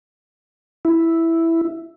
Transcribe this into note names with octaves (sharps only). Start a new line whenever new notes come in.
E4